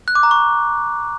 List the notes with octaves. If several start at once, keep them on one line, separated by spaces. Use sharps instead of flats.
F#6
D6
A#5
C#6